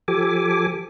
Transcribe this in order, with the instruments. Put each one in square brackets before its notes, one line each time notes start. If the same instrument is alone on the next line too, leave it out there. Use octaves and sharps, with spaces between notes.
[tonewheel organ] F3 G4 A4 G#5 D6